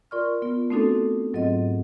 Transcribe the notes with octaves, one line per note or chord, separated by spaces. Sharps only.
F4 A#4 D5 C6 C#6 F6
B3 F4
A3 C4 D4 D#4 F#4 A4
G#2 F#3 C4 F4 D#5